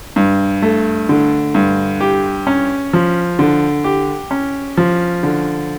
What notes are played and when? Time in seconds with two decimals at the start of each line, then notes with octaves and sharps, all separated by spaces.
0.16 G2
0.62 A3
1.09 D3
1.55 G2
2.01 G4
2.47 C#4
2.93 F3
3.39 D3
3.84 G4
4.31 C#4
4.77 F3
5.23 D3